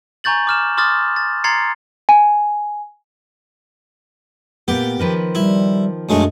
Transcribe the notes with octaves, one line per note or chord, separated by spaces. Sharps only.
G#5 A#5 C#6 G6 A6 F#7
D6 F6 E7
C6 D6 D#6 F6 A6
A6
A#5 C6 G#6 A6 C7 C#7
G#5
A#2 B3 G4
D#3 F3 B4
G3 E4
F#2 G#3 A3 D4